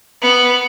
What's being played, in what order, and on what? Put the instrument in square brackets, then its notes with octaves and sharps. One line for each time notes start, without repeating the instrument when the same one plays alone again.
[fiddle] B3